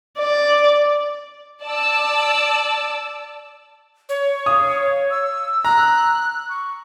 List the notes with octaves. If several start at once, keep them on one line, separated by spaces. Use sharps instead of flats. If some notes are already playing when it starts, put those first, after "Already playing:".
D5
D5 A5 D6 E6
C#5
F5 D#6
E6
A#5 F#6
C#6